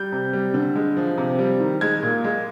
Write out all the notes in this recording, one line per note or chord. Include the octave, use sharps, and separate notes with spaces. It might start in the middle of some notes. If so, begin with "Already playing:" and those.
Already playing: G3 G6
C3
G3
D3
G#3
F3
C3
G3
D#3
G#3 G#6
A#2
G#3